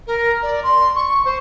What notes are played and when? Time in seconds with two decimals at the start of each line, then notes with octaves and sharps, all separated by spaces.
0.06 A#4
0.42 D5
0.63 C6
0.95 C#6
1.25 C5